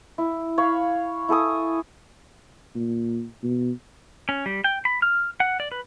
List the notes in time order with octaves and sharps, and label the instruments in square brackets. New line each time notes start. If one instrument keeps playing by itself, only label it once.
[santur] E4
C#5 F5 B5
E4 A4 G#5 D#6
[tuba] A#2
B2
[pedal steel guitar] C#4
G3
G5
B5
F6
F#5
D5
B4